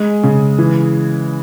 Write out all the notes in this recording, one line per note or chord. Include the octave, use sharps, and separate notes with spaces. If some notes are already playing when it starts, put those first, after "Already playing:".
Already playing: G#3 G#4
C#3
E3